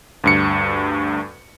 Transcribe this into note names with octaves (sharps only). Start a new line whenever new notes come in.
D2 G2 C#7